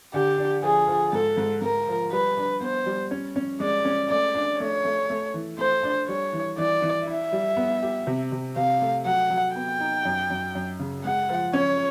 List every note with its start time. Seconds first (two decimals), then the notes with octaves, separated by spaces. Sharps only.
0.14 D3 G4
0.38 D4
0.63 F3 G#4
0.88 F3
1.12 G#2 A4
1.37 G#2
1.62 G#2 A#4
1.88 F3
2.12 G3 B4
2.37 D4
2.61 B3 C5
2.86 G3
3.11 C#4
3.36 C#4
3.60 G#3 D5
3.85 C#4
4.10 A3 D5
4.35 D4
4.60 A3 C#5
4.85 A3
5.10 A3
5.34 E3
5.58 A3 C5
5.83 D4
6.08 G3 C#5
6.33 E3
6.58 E3 D5
6.82 E3
7.07 E4 E5
7.32 G3
7.57 B3
7.83 G4
8.07 C3
8.32 C3
8.56 C3 F5
8.82 A3
9.05 F#3 F#5
9.30 F#3
9.56 B3 G5
9.80 D#4
10.05 F#2
10.30 F#2
10.55 F#2
10.80 C#3
11.04 G#3 F#5
11.29 F3
11.53 C#4 C#5